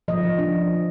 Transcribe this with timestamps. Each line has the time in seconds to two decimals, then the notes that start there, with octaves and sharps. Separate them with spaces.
0.08 F3 D#5
0.23 F3
0.38 D4